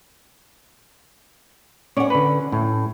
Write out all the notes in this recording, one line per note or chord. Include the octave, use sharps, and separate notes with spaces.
C#4 C#5 D5 F#5
D3 B4
A2